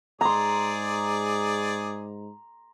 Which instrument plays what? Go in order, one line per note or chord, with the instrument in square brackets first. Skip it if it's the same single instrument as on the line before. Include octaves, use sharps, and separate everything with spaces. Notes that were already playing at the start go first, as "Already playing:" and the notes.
[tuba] G#2 [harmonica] G#4 D5 [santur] A#5 C6